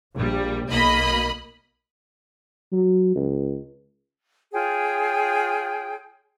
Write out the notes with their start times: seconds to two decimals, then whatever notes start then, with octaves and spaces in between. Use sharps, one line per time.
0.15 A#1 G3
0.69 B1 A#3 D#5 B5
2.72 F#3
3.15 C#2
4.52 F4 G#4 C#5 G5